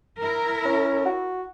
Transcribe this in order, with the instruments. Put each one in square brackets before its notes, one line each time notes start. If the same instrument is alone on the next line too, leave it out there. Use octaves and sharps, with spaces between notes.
[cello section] E4 A#4
[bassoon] C#4
F#4